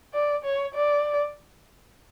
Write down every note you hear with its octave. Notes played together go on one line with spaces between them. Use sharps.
D5
C#5
D5